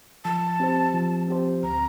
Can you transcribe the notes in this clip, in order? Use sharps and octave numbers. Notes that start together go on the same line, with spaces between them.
F3 A5
C4 G4 C5
F3
C4 G4 C5
D2 A#5